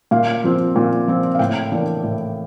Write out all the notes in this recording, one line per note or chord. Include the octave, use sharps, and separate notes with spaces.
A#2 F5
F3 C4
A#2
F3 C4
F5
A2 G5
E3 A#3 D4
A2